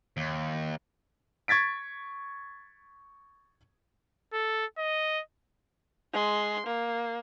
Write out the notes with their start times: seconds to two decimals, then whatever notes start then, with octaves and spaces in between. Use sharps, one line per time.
0.17 D#2
1.48 C#6 G#6 A6 B6 D7
4.33 A4
4.78 D#5
6.13 G#3 C6
6.66 A#3